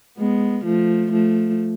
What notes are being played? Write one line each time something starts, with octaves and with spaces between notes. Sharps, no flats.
G#3 B3
F3 A3
F3 A3